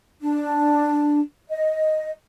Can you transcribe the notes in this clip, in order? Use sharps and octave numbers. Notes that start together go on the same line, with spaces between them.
D4
D#5